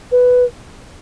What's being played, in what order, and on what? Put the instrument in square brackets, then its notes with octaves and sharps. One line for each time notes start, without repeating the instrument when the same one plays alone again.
[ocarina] B4